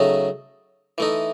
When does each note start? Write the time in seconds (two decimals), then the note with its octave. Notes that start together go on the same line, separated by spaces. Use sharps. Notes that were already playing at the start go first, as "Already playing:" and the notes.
Already playing: C#3 F#3 A3 D#4
0.98 E3 A3 D#4